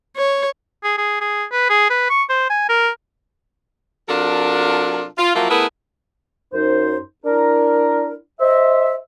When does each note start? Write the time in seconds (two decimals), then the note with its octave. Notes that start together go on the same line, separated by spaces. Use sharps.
0.17 C#5
0.83 G#4
0.97 G#4
1.20 G#4
1.52 B4
1.69 G#4
1.90 B4
2.10 C#6
2.30 C5
2.50 G#5
2.69 A#4
4.08 C3 F#3 D4 F4 A4 A#4
5.18 F4
5.34 F3 F#3 A#3 E4 F4
5.49 A3 B3 E4 G#4 A#4 B4
6.53 F#2 D#4 C5
7.24 D4 E4 A#4
8.40 C5 D#5 E5